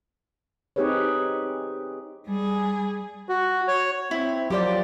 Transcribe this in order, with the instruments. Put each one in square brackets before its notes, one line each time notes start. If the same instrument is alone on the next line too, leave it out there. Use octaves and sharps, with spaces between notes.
[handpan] C4 D#4 G4 G#4 B4 C#5
[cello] G3 G#4
[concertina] F#4
C#5
[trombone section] C4 [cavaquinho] E4
[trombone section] F3 A#3 [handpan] F#3 D5 [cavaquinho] G4 C5 G5